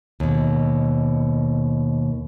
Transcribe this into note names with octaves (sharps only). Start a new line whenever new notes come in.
D#2 B2